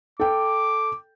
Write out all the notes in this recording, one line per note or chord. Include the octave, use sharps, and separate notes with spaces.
A4 G5 D6